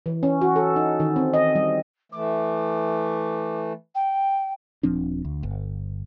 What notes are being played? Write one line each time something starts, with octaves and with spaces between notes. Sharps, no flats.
E3
C#4
F#4
A4
D#4
D#3
C4
D#5
G3
E3 A3 D6
G5
D#1 F3 C4 D4
D2
G1